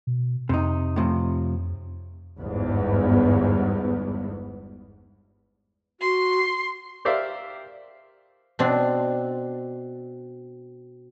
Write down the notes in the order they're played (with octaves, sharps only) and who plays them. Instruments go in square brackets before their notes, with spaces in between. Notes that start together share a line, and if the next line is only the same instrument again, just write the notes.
[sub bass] B2
[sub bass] F2 [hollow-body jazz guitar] C3 D#4
[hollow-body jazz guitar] A2 C3 F3
[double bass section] G1 E2 G#2 B3
[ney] F#4 [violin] C6
[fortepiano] G4 A#4 C5 D5 E5 F5
[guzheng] B2 C4 D4